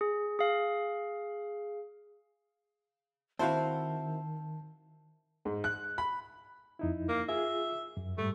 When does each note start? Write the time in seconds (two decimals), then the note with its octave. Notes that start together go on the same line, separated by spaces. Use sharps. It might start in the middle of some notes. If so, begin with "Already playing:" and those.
0.01 G#4
0.39 G#4 F5
3.39 D#3 C4 E4 F#4 C5 F5 A5
5.45 G#2
5.64 F#6
5.98 B5
6.79 F2 D#4 E4
7.09 A#3
7.28 F4 G#4 E5
7.97 F#2
8.18 G#2 G3 A3